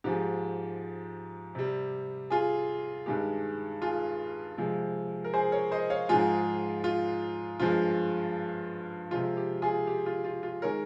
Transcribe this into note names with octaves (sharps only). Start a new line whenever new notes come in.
G#2 F3 G#3 G4
C3 G3
F4 G#4
G2 D#3 G#3 G4
F4 G#4
C3 F3 G#3
A#4
G#4 C5
A#4 C#5
C5 D#5
C#5 F5
G#2 F3 G#3 F4 G#4
F4
G2 F3 G#3 F4
C3 F3 G#3 F4
G4
F4 G#4
G4
F4
F4
F4
D#3 G#3 A#4 C#5